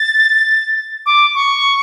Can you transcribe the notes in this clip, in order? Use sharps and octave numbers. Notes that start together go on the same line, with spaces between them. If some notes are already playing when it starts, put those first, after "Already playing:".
Already playing: A6
D6
C#6